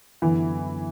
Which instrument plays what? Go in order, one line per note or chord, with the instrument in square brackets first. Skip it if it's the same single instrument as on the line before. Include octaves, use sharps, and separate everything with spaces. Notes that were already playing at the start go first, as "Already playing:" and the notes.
[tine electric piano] F#2 D3 F#3 B3 E4 [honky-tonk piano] E3